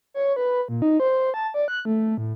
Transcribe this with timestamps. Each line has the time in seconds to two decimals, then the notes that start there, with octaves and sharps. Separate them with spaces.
0.14 C#5
0.36 B4
0.68 A#2
0.82 D#4
1.00 C5
1.34 A5
1.54 D5
1.68 F#6
1.85 A3
2.18 A2